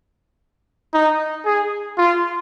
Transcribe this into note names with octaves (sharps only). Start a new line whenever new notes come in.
D#4
G#4
F4